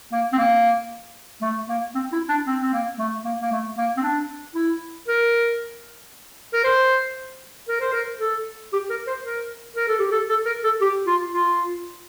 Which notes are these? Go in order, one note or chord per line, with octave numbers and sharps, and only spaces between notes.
A#3
C4
A#3
A3
A#3
C4
E4
D4
C4
C4
A#3
A3
A#3
A#3
A3
A#3
C4
D4
E4
A#4
A#4
C5
A#4
C5
A#4
A4
G4
A#4
C5
A#4
A#4
A4
G4
A4
A4
A#4
A4
G4
F4
F4